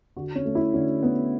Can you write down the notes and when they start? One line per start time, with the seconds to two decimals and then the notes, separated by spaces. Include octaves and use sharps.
0.17 D3 F#4
0.35 C#4
0.46 A3
0.55 E4
0.74 D3 C#4
1.02 A3 B3